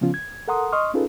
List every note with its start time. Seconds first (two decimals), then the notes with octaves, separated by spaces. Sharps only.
0.01 C#3 F3 B3 C#4 F4
0.14 G#6
0.48 A4 A#4 F#5 A#5 C6 D#6
0.72 D#5 C6 C#6 D#6 F6
0.94 C#4 D#4 F4 G#4 A4 B4